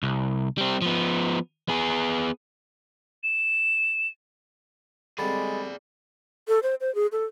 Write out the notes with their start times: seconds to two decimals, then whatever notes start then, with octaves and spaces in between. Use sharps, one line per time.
0.03 C2
0.58 G3 C4
0.82 F3 B3
1.69 B3 G#4
3.23 E7
5.19 D3 G3 G#3 C4 G#4 D5 B5 A6
6.48 A4
6.63 C5
6.81 C5
6.95 G#4
7.12 A4